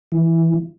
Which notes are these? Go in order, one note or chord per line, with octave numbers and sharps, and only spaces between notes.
E3